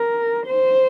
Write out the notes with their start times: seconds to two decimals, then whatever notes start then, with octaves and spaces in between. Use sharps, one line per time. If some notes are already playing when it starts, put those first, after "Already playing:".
Already playing: A#4
0.47 C5